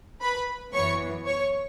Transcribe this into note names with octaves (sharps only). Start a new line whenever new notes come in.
B4 B5
F#2 E3 B3 C#5 C#6
C#5 C#6